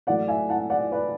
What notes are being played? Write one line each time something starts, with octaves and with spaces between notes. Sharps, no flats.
A2 F#3 A3 D5 F#5
E5 G#5
F#5 A5
D5 F#5
B4 D5